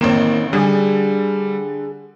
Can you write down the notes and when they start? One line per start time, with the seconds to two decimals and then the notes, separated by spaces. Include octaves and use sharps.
0.01 A1 D#3 A#3 C4 E7
0.53 D3 G3 G#4